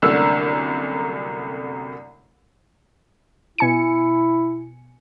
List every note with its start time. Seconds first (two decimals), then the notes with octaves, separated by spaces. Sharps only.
0.02 C2 F#2 D3 A3 A#3 E6
3.58 B2 E4 G#5 C#7